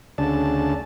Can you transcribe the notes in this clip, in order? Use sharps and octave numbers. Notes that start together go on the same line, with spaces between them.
D2 C#3 D4 A5